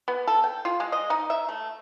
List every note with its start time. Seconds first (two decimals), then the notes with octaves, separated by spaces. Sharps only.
0.08 B3
0.27 A4
0.44 G5
0.65 F4
0.80 G#3
0.92 D#5
1.10 D#4
1.30 E5
1.49 A3